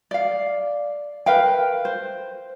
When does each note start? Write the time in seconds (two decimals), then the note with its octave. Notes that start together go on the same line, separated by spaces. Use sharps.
0.11 D5 F5
1.26 A#4 B4 F5 G5
1.85 C5